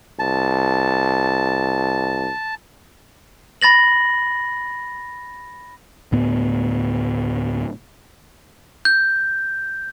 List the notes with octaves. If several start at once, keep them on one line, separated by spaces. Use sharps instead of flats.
C2 A5
B5 A6 A#6 F#7
D2 A2 B3
G6